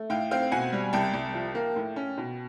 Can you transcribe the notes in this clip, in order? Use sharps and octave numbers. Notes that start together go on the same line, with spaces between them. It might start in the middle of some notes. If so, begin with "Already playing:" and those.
Already playing: A3
A2 F5 G5
C4 F5 G5
B2 F#5 G#5
G3
C2 G5 A5
C2
F3
A#3
A2
C#4
B2